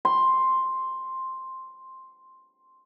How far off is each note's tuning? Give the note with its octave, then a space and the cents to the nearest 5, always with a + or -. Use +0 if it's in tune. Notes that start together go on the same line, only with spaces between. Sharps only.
C6 +5